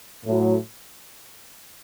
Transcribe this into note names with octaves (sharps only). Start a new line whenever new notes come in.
A2 F#3